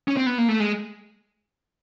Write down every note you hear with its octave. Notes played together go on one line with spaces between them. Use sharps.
C#4
C4
B3
A#3
A3
G#3